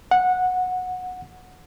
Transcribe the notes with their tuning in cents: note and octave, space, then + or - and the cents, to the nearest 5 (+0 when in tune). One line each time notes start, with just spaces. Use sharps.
F#5 -15